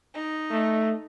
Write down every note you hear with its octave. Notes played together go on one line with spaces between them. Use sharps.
D#4
A3